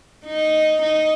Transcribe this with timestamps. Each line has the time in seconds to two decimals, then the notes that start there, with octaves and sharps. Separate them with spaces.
0.25 D#4
0.82 D#4